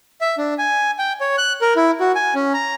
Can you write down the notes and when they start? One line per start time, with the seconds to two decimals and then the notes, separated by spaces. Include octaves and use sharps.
0.21 E5
0.38 D4
0.58 G#5
0.99 G5
1.21 C#5
1.38 F#6
1.61 A#4
1.76 E4
2.00 F#4
2.15 G#5
2.35 C#4
2.54 A#5